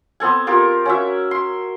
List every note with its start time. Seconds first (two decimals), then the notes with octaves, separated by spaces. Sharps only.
0.20 B3 C4 A4 G#5
0.47 F4 G4 A#4
0.85 C#4 F#4 E5
1.31 C6